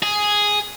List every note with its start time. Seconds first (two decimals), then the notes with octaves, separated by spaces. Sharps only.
0.03 G#4